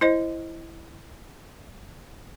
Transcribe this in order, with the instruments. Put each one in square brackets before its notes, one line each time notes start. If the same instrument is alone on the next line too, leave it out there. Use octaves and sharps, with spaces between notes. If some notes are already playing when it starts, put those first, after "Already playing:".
[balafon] E4 C5 D#5